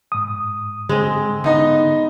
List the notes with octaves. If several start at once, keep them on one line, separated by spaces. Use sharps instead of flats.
G#2 D#6
D3 G#3 C4
D3 B3 D#4 D#5